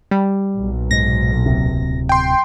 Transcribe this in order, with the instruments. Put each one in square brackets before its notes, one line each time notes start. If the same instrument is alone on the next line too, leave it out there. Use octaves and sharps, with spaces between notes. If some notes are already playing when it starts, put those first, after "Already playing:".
[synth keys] G3
[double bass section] B1 A#2
[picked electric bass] G#2 [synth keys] A#6
[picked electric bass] D1 C3
[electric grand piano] G5 C6